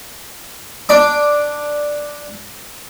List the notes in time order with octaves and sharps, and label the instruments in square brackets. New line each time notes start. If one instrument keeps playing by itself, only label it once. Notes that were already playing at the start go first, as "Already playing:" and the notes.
[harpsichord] D4 D5 D6